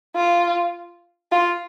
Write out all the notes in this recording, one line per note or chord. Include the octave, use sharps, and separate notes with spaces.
F4
F4